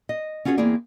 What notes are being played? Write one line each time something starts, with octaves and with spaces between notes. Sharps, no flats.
D#5
C#4 F4 F#4 G#4 C5 C#5
E2 A#3 C4 E4 G#4 D5